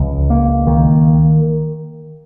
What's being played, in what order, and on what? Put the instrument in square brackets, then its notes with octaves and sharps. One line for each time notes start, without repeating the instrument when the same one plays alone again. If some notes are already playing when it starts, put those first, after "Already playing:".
Already playing: [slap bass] C#2 F3
A#3
D#3